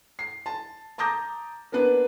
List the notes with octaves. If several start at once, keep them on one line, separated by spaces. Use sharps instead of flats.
C7
A5
A5 A#5 D6 D#6 G6 A#6
A#3 B3 D4 B4